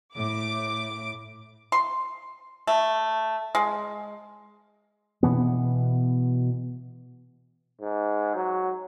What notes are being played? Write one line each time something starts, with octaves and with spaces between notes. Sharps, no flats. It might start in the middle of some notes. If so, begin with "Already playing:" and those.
A2 D6
C6
A3
G#3
B2 E3 B3
G#2
F#3